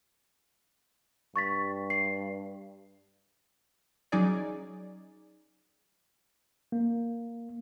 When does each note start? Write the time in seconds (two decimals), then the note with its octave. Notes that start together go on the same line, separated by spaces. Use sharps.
1.36 G2 C#6 A6 B6
1.90 C7
4.12 F#3 C#4 D#4 G#4 D5
6.72 A#3